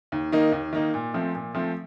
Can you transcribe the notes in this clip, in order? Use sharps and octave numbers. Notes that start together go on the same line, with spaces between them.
D#2
D#3 A#3 D#4
D#2
D#3 A#3 D#4
A#2
F3 A3 C4
A#2
F3 A3 C4